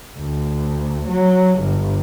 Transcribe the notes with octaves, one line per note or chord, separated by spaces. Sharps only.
D2
F#3
G1